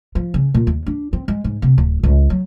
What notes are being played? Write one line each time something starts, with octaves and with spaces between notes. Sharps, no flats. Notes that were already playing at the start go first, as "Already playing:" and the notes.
F3
C#3
A#2
D#2
D4
C4
G#3
G#2
C3
D1
C#2
F#3